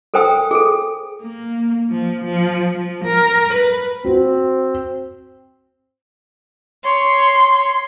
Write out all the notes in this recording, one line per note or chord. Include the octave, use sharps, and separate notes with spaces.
A4 A#4 C5 G5 G#5 D#6
G#4 A4
A#3
F3
F3
F3
A#4
B4
C4 F#4
C#5 C6